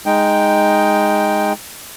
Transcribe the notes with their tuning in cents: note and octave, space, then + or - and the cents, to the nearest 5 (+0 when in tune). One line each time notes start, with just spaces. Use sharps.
G#3 +0 D#4 +0 G5 +0